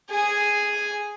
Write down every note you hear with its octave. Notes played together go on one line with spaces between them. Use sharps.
G#4 G#5